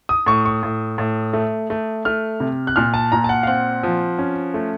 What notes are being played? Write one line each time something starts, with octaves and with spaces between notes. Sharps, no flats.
D#6
A2 C#6
C#6
A2
A2
A3
A3
A3 F6
C3
F#6
A#2 F6
A5
A#2 A#5
A5
F#5
F5
C4 F#5
F3
C#4
A3